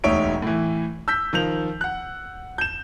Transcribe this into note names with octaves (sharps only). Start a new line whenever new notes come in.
E1 D2 D#4 C#5 E5 D7
A2 E3
E6 G6 B6
D#3 F3 G6 F7 F#7
F#5 F#6
G6 E7